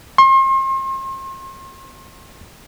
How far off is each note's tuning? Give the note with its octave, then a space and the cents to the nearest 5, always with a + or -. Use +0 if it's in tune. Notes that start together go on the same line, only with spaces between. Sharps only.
C6 +40